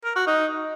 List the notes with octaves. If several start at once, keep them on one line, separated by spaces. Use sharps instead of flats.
A#4
F#4
D#4